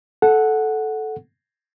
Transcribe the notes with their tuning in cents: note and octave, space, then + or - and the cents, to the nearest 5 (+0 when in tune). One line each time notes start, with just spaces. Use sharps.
A4 -10 F#5 -5